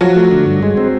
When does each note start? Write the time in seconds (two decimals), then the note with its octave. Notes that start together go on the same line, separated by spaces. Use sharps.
0.01 F3 F#3 F#4
0.16 A3
0.31 D3
0.46 G2
0.63 G#3
0.77 C4